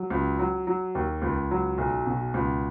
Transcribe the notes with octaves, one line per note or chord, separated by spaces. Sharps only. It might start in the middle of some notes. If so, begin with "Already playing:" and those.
Already playing: F#3
C#2
F#3
F#3
D#2
C#2
F#3
B1
B2
C#2